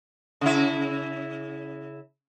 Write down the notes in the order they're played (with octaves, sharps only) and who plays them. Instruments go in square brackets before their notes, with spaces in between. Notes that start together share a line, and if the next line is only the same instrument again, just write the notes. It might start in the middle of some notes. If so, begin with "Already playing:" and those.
[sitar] C#3 E4